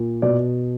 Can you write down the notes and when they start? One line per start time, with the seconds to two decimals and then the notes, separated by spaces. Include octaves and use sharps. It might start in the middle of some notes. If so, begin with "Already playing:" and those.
Already playing: A#2
0.22 B2 D5